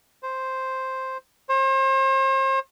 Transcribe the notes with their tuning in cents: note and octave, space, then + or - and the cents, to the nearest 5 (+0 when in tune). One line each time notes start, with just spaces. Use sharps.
C5 +0
C5 +40